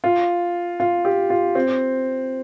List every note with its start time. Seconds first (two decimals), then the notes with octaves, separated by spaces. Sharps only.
0.04 F4
0.80 F4
1.05 G4
1.30 F4
1.55 C4